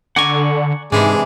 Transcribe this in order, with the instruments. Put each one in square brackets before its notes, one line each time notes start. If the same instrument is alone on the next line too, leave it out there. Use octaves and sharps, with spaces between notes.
[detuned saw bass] D3 [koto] D5 G#5 A#5 [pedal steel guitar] F#5 C#6
[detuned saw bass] G#2 [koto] C3 E3 D4 [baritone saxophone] G#3